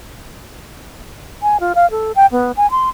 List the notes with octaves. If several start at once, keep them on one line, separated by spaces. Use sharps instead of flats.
G#5
F4
F5
A4
G5
B3
G#5
C6